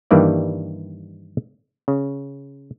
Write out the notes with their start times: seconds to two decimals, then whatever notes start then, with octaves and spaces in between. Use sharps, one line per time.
0.11 G2 D#3 E3 G3 A#3 D5
1.88 C#3